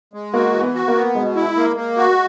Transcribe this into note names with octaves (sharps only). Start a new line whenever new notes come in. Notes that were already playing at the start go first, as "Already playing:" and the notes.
G#3
A#3 F#4
E3
B3
F#4
A#3
B3
B2 G#3
E4
A#3
A#3
F#4